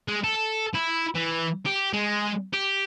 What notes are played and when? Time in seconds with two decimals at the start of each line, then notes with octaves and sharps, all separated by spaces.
0.08 G#3
0.24 A4
0.74 E4
1.15 E3
1.66 G4
1.93 G#3
2.53 G4